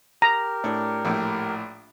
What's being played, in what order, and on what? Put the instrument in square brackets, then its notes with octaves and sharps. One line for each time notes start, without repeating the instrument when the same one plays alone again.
[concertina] G4 A#4 [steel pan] A#5
[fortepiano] A2 D4
A#1 A2 G5